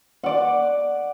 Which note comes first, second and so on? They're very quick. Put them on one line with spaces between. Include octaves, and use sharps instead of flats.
F#5 D5 D6